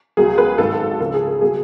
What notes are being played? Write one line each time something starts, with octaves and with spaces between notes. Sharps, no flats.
C#2 B2 F#3 G#4
B4
G#1 G#2 F#3 A4
C#2 C#3 F3 A4
G#4
A4
B2 F#3 G#4